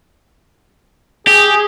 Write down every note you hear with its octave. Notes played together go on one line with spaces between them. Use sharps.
G4 G#4